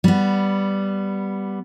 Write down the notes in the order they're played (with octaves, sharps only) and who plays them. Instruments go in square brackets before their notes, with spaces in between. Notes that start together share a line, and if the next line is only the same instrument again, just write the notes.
[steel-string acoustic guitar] G3 B3